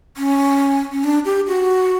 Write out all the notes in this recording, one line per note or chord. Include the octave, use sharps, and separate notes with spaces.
C#4
C#4
D4
G4
F#4